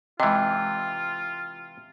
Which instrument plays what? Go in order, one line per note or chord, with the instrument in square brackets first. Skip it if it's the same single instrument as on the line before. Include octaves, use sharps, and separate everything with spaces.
[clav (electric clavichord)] C3 E3 [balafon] G#3 D#5 [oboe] F4